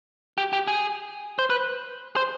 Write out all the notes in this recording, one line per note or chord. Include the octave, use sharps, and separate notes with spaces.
G4
G4
G#4
C5
B4
C5